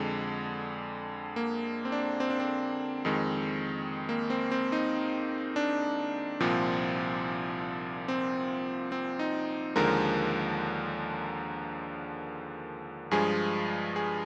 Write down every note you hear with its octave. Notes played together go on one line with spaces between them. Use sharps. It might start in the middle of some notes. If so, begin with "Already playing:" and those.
Already playing: F2 D3 G#3
A#3
C4
D4
C4
D4
C4
F2 D#3 G#3
A#3
C4
C4
D#4
D4
C2 A#2 F3 C4
C4
C4
D#4
D#2 D3 F3 G#3 A#4
G2 F3 G#3 G#4
G#4